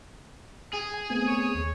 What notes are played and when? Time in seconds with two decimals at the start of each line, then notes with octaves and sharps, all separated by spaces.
0.74 G#4
0.94 G#5
1.10 A3 B3 C4 G#5
1.28 C#5
1.55 D#2